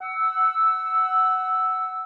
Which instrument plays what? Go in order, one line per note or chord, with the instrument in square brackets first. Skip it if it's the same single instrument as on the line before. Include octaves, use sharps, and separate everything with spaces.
[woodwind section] F#5 E6